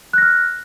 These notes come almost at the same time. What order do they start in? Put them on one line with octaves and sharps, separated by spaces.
F#6 A#6 F6